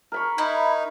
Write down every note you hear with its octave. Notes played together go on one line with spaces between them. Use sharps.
A#4 B5 C#6
D#4 E4